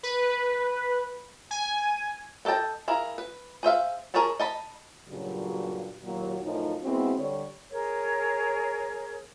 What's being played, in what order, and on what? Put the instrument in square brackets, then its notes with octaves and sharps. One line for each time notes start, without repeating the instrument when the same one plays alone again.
[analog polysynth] B4
G#5
[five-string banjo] B3 A4 D#5 G5 A5
E4 G#4 A#4 F5
B4
G#4 C5 E5 F5
G#4 A#4 C#5 A5 B5
D#5 A5 B5
[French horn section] G2 A#2 C#3 F#3
D#2 A#2 F#3
F#2 A2 F3 C#4 D#4
G#3 B3 C4 E4 F#4
D3 G3 C#5
[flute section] G#4 A#4 C#5